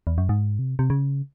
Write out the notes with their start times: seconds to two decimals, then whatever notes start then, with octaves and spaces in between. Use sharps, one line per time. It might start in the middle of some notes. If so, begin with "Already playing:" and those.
0.07 E2
0.18 F#2
0.29 G#2
0.59 C3
0.79 C3
0.90 C#3